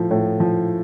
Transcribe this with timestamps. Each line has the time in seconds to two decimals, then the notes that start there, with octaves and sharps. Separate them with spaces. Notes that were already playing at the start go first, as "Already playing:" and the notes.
Already playing: A2 F3
0.11 A2
0.40 F3